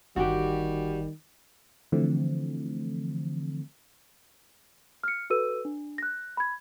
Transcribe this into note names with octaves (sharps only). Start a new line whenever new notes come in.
G1 D#3 G3 F#4 G4
D3 E3 F3 A3 C4
F6 C#7
F#4 A4 B4 E6 D#7
D4
F#6 A#6
B5 G#6